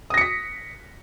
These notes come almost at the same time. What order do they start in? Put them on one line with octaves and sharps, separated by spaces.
D#6 A#6 C#7 B6